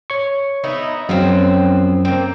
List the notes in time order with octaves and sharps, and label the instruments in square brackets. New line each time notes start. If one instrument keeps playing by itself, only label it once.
[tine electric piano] C#5 C#6
[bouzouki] B3 D#4 E4
[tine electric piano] F#2 [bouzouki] F3 F#3 C4
[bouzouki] A#3 C4